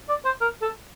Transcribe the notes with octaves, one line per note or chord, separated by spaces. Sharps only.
D5
C5
A#4
A4